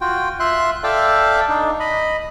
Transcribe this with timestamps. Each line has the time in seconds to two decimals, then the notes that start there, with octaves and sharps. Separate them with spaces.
0.01 F4 F#4 G5
0.40 F4 E5 C6 F#6
0.84 A4 D5 E5 F5 G5 A5
1.49 D4 D#4
1.80 D#5 B5